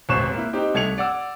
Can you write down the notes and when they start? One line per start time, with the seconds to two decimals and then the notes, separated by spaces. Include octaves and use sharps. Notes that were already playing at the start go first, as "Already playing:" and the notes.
0.09 E1 A1 C4 C#6 F#6 E7
0.34 A#3 E4
0.53 C4 D#4 G4
0.74 C2 A3 G#6 C#7 F7
0.98 D5 F#5 E6